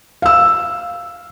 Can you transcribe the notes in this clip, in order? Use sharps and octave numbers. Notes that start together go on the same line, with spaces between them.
F5 E6